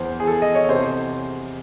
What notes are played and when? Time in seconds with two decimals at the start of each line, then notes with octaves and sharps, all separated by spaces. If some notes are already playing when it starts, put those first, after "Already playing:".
Already playing: E2 C5
0.20 G#4
0.27 E3 A4
0.42 D#5
0.55 C#5
0.69 C3 C5